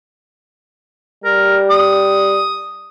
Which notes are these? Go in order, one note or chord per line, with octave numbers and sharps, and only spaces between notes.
G3 A#4
D#6